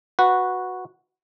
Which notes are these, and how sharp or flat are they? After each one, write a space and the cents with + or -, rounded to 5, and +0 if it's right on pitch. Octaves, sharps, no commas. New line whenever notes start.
F#4 -10 B4 +0